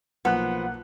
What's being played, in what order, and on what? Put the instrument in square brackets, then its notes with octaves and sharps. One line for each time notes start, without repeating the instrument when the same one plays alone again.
[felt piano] B1 A#3 F#6 [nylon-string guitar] F3 [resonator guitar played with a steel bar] B3 [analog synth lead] F#5